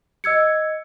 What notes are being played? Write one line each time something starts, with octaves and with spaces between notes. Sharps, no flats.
D#5 E6 G#6 C#7